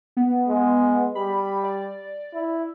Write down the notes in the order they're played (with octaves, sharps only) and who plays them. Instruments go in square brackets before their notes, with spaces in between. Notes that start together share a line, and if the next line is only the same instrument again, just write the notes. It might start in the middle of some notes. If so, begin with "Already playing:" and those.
[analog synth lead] B3
[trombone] G#3
[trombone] G3 [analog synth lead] B5
[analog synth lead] D5
[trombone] E4